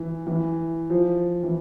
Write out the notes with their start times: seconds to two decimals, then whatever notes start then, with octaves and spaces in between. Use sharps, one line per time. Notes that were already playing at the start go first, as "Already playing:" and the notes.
Already playing: E3
0.27 E3
0.90 F3
1.43 E3